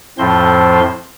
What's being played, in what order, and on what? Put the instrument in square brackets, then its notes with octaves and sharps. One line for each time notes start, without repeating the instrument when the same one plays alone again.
[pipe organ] F2 A2 F3 C4 C5 C6